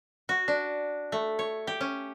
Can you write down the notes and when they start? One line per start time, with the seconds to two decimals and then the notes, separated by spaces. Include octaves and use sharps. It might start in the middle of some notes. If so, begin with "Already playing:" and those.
0.29 F#4
0.48 D4
1.12 A3
1.39 C#5
1.67 G4
1.81 C#4